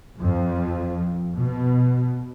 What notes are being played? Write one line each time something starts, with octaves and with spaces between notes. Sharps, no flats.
F2
B2